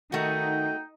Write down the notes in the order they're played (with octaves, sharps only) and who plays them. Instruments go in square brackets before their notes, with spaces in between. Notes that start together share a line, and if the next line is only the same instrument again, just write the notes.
[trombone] D#3 [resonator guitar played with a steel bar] A3 F#4 [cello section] D#4 [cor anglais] G5